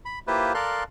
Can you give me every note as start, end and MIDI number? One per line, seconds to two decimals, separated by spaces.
0.05 0.19 83
0.27 0.53 58
0.27 0.53 64
0.27 0.53 65
0.27 0.53 67
0.27 0.53 71
0.27 0.53 72
0.54 0.84 69
0.54 0.84 70
0.54 0.84 74
0.54 0.84 77
0.54 0.84 84
0.54 0.84 90